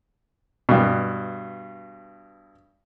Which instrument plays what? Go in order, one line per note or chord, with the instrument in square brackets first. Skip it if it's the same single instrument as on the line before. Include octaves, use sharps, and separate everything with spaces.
[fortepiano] G2 B2